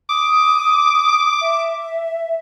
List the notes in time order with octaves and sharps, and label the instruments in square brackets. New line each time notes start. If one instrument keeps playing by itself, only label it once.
[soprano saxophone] D6 [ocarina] D#6
[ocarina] E5